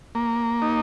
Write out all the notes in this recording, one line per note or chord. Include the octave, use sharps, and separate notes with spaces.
A#3
D#4